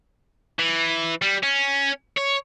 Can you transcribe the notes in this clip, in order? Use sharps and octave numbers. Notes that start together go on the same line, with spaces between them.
E3
G3
C#4
C#5